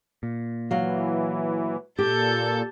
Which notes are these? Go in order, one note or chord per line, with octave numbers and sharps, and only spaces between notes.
A#2
E3 F#3 F5
A#2 G4 A4 A5 G6